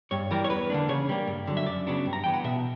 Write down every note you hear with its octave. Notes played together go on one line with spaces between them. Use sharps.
G2 C#5
E3 G3 A#4
C#5
E2 B4
D3 A#3 D4
C#3 C#5
G3 A#3
G2
D3 F#3
E5
F#2 D5
C#3 F#3 B3 D4
G2
A#5
E3 B3 G5
F#5
B2 E5